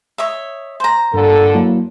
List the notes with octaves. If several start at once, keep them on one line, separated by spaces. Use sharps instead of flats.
C#5 D#5 E5
C5 A#5
G2 A#2 D3 A4
F#3 A#3 E4